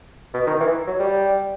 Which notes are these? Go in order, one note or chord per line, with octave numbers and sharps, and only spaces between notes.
B2
D#3
E3
F#3
G3